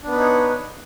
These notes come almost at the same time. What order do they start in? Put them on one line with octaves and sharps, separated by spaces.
D4 B3 B4 D#4 C#5